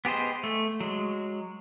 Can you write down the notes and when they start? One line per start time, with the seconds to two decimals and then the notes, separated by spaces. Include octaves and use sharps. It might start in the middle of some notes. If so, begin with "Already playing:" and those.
0.05 B3 G4 G#4 C5 D#5
0.44 A3
0.80 F#3 G#3